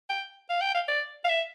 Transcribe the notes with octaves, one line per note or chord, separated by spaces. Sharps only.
G5
F5
G5
F5
D5
F5
E5